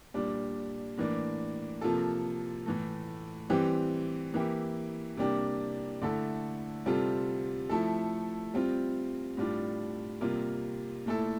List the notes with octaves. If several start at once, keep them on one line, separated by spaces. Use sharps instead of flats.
A#2 G3 D4
A2 E3 A#3 D4
C3 F3 A#3 F4 A4
A2 E3 A3
E3 G3 C4 G4
E3 A#3 E4 G4
C3 G3 A#3 D4 G4
D3 A3 E4 A4
C3 G3 C4 F4 A4
F3 A3 E4 A4
G3 C4 F4
A2 G3 D4 F4
C3 G3 A#3 F4
A#2 A3 E4 A4